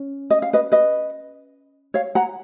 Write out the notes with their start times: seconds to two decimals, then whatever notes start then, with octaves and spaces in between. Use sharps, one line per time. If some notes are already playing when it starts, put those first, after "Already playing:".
Already playing: C#4
0.30 D#5
0.42 F5
0.53 B4 D#5
0.72 B4 D#5
1.94 C#5 F5
2.15 F#5 A#5